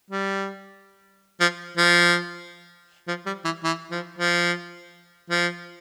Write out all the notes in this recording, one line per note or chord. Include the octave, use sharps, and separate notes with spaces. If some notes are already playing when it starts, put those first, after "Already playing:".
G3
F3
F3
F3
G3
E3
E3
F3
F3
F3